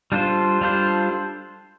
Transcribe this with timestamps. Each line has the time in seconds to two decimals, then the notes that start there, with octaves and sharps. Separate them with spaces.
0.12 G3 D4 F4 A4 C5
0.61 G3 D4 F4 A4 C5